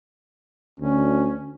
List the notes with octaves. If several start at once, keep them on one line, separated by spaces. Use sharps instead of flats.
D2 C#4